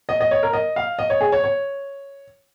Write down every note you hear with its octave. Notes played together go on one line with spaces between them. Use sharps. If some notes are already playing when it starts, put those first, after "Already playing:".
D#5
D#5
C#5
A#4
D#5
F5
D#5
C#5
G#4
C#5
C#5